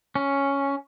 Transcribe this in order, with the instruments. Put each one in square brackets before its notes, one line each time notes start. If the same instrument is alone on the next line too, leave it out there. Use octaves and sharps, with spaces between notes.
[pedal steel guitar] C#4